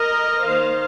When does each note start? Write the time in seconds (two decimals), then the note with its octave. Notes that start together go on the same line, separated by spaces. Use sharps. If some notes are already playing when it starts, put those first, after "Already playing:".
Already playing: A#4 D#5
0.44 D#3 A#3 C5 F5